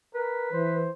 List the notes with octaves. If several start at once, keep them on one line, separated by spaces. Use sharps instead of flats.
A#4 B4
E3 C5